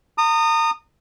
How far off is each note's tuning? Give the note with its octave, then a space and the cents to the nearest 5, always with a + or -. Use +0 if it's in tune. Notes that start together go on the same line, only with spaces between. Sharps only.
A#5 -40 D#6 -20